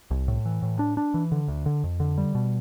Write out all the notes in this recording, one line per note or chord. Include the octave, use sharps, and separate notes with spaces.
C2
A2
E3
A2
D4
D4
E3
D3
D2
D3
F2
D3
G3
B2